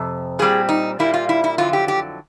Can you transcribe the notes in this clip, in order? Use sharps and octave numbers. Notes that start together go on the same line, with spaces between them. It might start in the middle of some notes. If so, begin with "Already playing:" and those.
Already playing: F2 C3
A#2 G3 C4 G#4
D#4
A#2 G3 A#3 E4
F4
E4
E4
F2 D3 F#3 F4
G4
G4